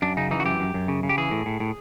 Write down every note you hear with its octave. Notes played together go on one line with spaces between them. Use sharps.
F#2 D4
C#3 D#4
E3 D#4
F#4
F#2 G4
F#2
F#2
C#3
C#3
G4
E3 G#4
A2
A2
A2